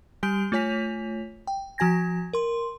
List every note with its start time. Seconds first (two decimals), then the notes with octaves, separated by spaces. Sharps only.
0.23 G3 G4 G#5 G6 D7 G7
0.52 A3 F4 C#5 G#5 B6 F7
1.47 G5
1.78 F3 F#4 G#5 G#6 A#6
2.33 A#4 C6